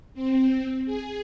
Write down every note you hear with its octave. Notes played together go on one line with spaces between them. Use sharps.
C4
G#4